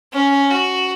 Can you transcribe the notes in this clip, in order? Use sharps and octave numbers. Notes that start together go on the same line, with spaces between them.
C#4
F#4